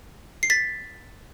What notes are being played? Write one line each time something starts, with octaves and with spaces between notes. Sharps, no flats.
C7
A6 B6